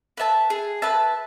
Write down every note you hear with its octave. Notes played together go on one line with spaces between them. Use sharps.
B4 E5 A5
G#4
B4 E5 A5